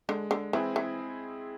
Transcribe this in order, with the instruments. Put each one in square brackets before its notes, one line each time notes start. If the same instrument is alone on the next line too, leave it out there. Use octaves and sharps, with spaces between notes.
[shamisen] D3 [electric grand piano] G#3
[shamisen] D3
[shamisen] E3 [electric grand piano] C4 E4 G#4
[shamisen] E3